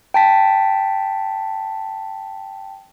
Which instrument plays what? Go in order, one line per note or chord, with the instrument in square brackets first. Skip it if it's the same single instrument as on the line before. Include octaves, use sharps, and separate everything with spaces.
[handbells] G5 A5 B6